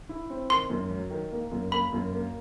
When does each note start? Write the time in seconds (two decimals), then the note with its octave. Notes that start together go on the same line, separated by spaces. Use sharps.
0.09 E4
0.30 C4
0.49 D#3 C6
0.70 F#2
0.90 F#3
1.10 D#3
1.31 A#3
1.51 F#2
1.72 A#3 B5
1.93 F#2
2.13 A#3